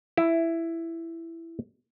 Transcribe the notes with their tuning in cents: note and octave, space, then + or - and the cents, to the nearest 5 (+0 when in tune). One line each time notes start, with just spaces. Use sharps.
E4 +10